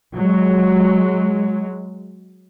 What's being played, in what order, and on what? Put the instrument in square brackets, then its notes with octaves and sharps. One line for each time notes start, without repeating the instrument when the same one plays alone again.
[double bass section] F#3 G#3